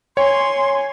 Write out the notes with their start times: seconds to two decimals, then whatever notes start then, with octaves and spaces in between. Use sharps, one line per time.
0.17 C#5 G#5 C6